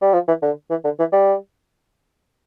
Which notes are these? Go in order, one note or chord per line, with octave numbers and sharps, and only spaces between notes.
G3
F3
E3
D3
E3
D3
E3
G3